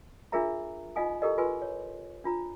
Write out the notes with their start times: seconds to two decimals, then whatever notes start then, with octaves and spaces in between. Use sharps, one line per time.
0.32 D4 F4 G#4 A#4 E5 A#5
0.96 D#4 F4 D#5 F5 G#5 D#6
1.22 E4 G4 A4 A#4 D#5
1.38 F4 A#4 B4 G#5 C6
1.62 C#5
2.24 D4 F4 A#5